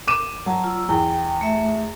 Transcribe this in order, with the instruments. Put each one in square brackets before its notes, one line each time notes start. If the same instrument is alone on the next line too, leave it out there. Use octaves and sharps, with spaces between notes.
[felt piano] D6 D#7 E7
[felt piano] F#3 [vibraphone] A5
[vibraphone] F4 E6
[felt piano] E2 [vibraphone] G5
[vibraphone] A3 E5